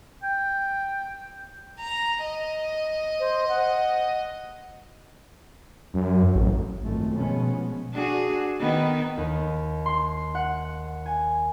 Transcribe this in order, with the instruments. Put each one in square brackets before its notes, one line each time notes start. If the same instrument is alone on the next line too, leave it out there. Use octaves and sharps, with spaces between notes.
[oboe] G5
[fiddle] A#5
D#5
[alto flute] C5
F#5
[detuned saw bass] F#2
A1
[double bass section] G#1 F#2 F3 G#3 A3
B2 F3 G#3 B3 C#4
[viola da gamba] D4 F#4 G#4
D#3 B3 D#4
[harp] D#2
C6
F#5
G#5